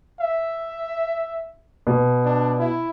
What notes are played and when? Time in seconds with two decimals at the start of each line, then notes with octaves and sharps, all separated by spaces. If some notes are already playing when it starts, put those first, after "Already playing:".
0.21 E5
1.87 B2
2.24 D4
2.59 E4